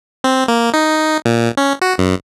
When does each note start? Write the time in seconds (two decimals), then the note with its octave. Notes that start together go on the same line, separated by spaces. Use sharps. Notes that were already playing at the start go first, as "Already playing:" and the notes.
0.24 C4
0.48 A#3
0.74 D#4
1.25 A#2
1.57 C#4
1.82 F#4
1.98 F#2